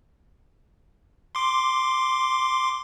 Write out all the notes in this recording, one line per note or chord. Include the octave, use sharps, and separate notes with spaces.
C6 D6